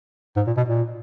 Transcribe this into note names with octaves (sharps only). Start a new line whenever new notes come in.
G#2
A#2
B2
A#2